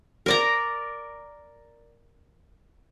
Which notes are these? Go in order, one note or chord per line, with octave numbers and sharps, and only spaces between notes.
A#4 D5 A#5